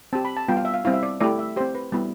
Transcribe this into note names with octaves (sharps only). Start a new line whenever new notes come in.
C4 G4 A5
B5
A5
G3 B3 F4 G5
F5
E5
F5
G3 C4 E4 F5
E5
D5
A3 E4 G4 D5
E5
C4 G4 C5
B4
G3 B3 E4